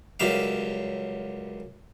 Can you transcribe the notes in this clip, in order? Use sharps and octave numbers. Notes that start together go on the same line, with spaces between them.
C#2 F#2 G3 E5 F5